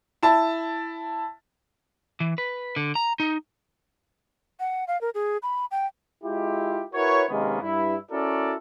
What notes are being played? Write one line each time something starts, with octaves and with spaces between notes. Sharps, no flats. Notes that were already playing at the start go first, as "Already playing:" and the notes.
E4 A5
E3
B4
D3
A#5
D#4
F#5
F5
A#4
G#4
B5
G5
G#3 E4 F4 G4
E4 F#4 A#4 B4 C#5
C3 D#3 G#3 A#3 B3 C#4
G2 E4
C#4 E4 F#4 A4 A#4 D5